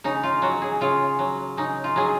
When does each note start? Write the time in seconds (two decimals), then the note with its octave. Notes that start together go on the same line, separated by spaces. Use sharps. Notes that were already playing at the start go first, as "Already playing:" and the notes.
0.04 C#3 D#4
0.23 F4
0.42 F#3 F#4
0.62 G#4
0.81 C#3 F4
1.19 F#3
1.57 C#3 D#4
1.84 F4
1.96 F#3 G#4